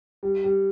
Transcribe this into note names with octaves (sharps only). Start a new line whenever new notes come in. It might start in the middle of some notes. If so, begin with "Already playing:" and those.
G3
G3